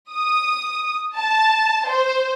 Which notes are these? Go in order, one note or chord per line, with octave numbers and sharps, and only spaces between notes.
D#6
A5
C5